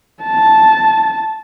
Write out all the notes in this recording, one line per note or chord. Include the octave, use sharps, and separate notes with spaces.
A5